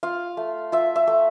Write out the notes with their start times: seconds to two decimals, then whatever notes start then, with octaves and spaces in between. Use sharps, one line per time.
0.03 F4 F5
0.37 A3
0.72 F4 E5
0.96 E5
1.07 A3